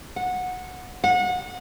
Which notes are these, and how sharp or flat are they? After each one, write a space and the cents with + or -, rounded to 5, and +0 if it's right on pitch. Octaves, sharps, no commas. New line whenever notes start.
F#5 -15
F#5 -30